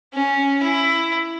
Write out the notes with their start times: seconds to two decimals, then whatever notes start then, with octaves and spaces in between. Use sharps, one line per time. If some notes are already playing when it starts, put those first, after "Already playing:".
0.13 C#4
0.62 E4